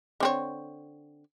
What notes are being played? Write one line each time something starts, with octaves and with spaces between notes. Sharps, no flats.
D3 C4 C#5